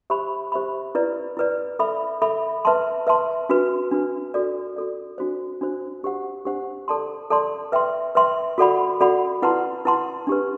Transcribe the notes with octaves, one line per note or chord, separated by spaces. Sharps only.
G4 C5 E5 B5
G4 C5 E5 B5
E4 B4 D5
E4 B4 D5
A4 E5 B5
A4 E5 B5
B4 E5 A5 C6
B4 E5 A5 C6
D4 F#4 B4
D4 F#4 B4
F#4 A4 D5
F#4 A4 D5
D4 F#4 C5
D4 F#4 C5
D4 G4 C5 F#5
D4 G4 C5 F#5
A4 D5 A5 C6
A4 D5 A5 C6
B4 E5 G5 C6
B4 E5 G5 C6
F#4 A4 D5 F#5 B5
F#4 A4 D5 F#5 B5
E4 B4 F#5 A5 C6
E4 B4 F#5 A5 C6
D4 G4 B4